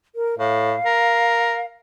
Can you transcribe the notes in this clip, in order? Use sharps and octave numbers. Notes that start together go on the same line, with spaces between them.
A#4
A2 F5
A#4